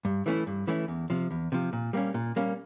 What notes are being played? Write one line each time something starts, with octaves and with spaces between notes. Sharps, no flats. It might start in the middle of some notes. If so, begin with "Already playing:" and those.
G2
E3 A3 C#4 E4
G2
E3 A3 C#4 E4
E2
C3 F3
E2
C3 F3
A#2
G3 A#3 C#4
A#2
G3 A#3 C#4